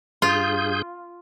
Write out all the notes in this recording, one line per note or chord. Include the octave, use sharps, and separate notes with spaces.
G2 F4 G#4 G6